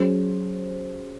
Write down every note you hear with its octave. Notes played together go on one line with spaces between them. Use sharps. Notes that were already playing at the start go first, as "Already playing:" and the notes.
Already playing: F#3 C#4 G#4 C5